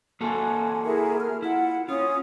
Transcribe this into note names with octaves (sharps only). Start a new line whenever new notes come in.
A#3 F#4 A4 G#5
E4 G#4 A#4
F6
E4 F4 F#5
C#4 F4 C#5 D#6